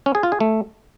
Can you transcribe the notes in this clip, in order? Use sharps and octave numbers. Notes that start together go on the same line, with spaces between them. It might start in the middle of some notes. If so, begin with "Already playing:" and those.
C#4
G#4
F4
G#4
A3